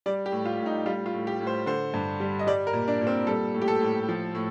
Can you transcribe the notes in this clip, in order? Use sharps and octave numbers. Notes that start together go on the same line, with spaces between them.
G3 D5
G4
A2
F4
A2
D#4
G3 F4
F4
A2
G4
A2
C5
D3 C5
G2
G3
D#5
G3 D5
A#4
A#2
D4
A#2
C4
G3 A4
A2
G4
A4
A2
F3
A2